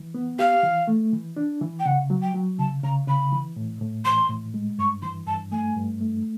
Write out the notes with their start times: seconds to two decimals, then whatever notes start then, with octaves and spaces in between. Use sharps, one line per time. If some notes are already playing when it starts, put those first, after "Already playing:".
Already playing: E3
0.14 B3
0.39 G4 F5
0.63 E3
0.88 A3
1.13 E3
1.37 D4
1.61 E3
1.79 G5
1.86 C#3 F#5
2.10 F#3
2.22 G5
2.35 F#3
2.58 C#3 A5
2.83 C#3 A#5
3.07 C#3 B5
3.32 E3
3.56 A2
3.81 A2
4.05 E3 C6
4.30 A2
4.54 G#3
4.78 G2 C#6
5.02 E3 C6
5.27 G2 A5
5.52 A3 G#5
5.76 G2
6.01 A3